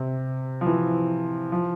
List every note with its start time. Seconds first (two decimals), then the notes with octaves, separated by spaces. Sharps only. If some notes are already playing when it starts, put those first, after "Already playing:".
Already playing: C3
0.61 F3
0.66 E3
1.52 F3